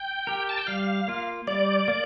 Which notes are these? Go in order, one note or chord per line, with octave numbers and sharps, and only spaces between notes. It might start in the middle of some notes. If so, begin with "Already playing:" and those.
Already playing: G5
G4 A#4
A5
G5
G3 F5
A#3 F4
G3 D5
A#3